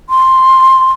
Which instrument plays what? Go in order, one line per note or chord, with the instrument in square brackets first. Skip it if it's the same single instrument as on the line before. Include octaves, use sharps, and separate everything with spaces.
[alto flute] C6